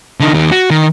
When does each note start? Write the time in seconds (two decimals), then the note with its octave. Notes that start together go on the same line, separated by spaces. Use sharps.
0.20 D3 D#4
0.34 D#2 G4
0.52 F#4
0.70 D#3